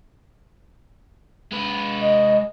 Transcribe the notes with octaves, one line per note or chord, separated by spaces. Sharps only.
G#3 B4
D#5